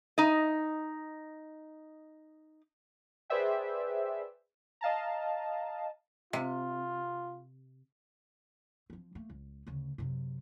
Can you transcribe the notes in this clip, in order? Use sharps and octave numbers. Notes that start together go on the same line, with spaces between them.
D#4 D#5
G#4 B4 C5 D5 E5 G5
D#5 F5 A5 A#5
C3 F4
F3 C4
A3 A#3
C#2
D2 C#3
F#2 C3